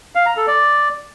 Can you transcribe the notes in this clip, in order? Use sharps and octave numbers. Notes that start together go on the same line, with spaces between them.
F5
A#5
A4
D5